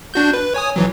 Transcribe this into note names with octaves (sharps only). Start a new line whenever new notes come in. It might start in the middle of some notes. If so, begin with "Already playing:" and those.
D4 F#4 G6
B4
C#5 G#5 D#6
A#1 E3 F#3